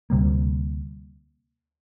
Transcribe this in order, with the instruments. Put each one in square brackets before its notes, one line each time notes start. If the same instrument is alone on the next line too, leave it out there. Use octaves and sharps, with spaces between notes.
[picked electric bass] D2 C3 G3 A#3